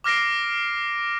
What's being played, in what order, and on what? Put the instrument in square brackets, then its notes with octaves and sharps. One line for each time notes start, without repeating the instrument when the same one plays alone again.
[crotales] D6 F6 A#6 C7 D7